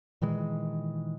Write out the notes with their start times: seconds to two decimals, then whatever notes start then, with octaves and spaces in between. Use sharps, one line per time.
0.22 A#2 D#3 E3 G#3